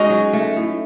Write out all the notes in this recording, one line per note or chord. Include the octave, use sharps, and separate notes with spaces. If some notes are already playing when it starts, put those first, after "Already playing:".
Already playing: G#3 C#4 D#4 F#4
F#3
A3
A2